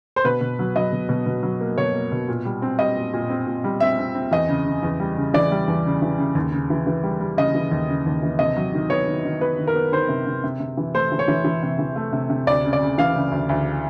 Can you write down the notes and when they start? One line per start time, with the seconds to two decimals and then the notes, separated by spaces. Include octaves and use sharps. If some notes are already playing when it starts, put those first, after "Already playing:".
0.16 C5
0.25 B2 B4
0.41 B2
0.59 F#3
0.76 F#3 D#5
0.92 B2
1.09 B2
1.26 B2
1.43 F#3
1.61 A#3
1.78 B2 C#5
1.94 A#3
2.12 B2
2.29 A#2
2.45 G3
2.62 C4
2.79 G3 D#5
2.96 A#2
3.13 A#2
3.30 C4
3.47 A#2
3.64 G3
3.80 C4 E5
3.99 C4
4.15 C4
4.31 E2 D#5
4.49 C#3
4.66 C#3
4.83 E2
5.00 G3
5.17 C#3
5.34 E3 D5
5.51 G3
5.68 E2
5.85 C#3
6.02 E3
6.18 C#3
6.35 D#2
6.52 C#3
6.70 E3
6.87 E3
7.03 G3
7.21 G3
7.37 C#3 D#5
7.55 E3
7.71 D#2
7.89 C#3
8.06 D#2
8.23 E3
8.39 C3 D#5
8.56 F#3
8.74 D#3
8.90 B3 C#5
9.07 D#3
9.25 D#3
9.41 B3 B4
9.58 D#3
9.67 A#4
9.75 B3
9.92 D#3 C5
10.09 C3
10.26 C3
10.44 C3
10.60 C3
10.77 E3
10.94 A3 C5
11.12 E3
11.19 C#5
11.28 E3
11.45 E3
11.63 C3
11.79 E3
11.96 A3
12.13 C3
12.30 C3
12.46 D2 D5
12.65 C#3
12.73 D5
12.82 C#3
12.98 E3 F5
13.16 C#3
13.31 D2
13.49 D2